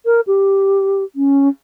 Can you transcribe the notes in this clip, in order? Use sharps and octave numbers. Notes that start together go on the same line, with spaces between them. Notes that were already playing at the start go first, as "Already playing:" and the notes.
A#4
G4
C#4